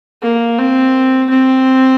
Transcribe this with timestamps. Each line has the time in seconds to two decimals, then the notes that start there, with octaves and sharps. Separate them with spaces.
0.23 A#3
0.59 C4
1.30 C4